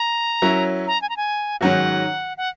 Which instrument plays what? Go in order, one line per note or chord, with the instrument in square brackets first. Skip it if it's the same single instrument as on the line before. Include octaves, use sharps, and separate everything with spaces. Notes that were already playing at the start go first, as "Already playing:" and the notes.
Already playing: [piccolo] A#5
[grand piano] F#3 C#4 E4 A#4 E5
[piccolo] A#5
G#5
A#5
G#5
[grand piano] G#2 D#3 F#3 C#4 F#4 [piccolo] F#5
[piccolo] F#5